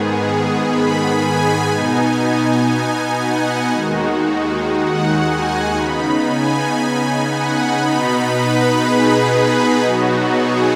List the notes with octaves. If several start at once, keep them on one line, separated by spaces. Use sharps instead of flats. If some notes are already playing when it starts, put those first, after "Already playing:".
Already playing: G#2 D#3 B3 G#4
G#4
B5
G#5
B2 B3 D#4 G#5
G#5
F#5
D#2 D#3 G#3 D#4 F#4
F#4
F#5
G#5
C#3 B3 D#4 B5
G#5
F#5
B2 B3 D#4 B5
B4
G#4
G#4
B2 F#3 B3 D#4 F#4
G#4